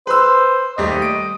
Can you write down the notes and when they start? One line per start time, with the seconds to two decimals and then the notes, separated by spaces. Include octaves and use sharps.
0.07 B4 C5 E6
0.78 D#2 G3 A3 D#5
1.02 D7